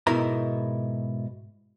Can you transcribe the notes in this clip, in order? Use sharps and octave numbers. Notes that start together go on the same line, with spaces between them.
G#2 B2 D#4 E4 A#4 A#5